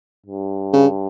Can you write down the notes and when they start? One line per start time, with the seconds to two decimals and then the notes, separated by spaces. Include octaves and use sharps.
0.26 G2
0.73 C#3